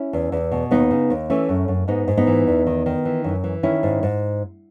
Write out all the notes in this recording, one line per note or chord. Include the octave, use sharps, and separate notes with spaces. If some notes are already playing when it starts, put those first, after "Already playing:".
Already playing: C#4 E4
E2
E2
B2
D#2 B3 D#4
C#3
D#2
E3 A3 C#4
F#2
F#2
G#2 B3 D#4
G#2
B3 D#4
E3
E2
D#3
D#3
E3
F#2
E3
D#3 C#4 E4
G#2
G#2